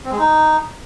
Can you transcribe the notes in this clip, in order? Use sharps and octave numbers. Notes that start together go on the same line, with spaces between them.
C4
G#3
D#4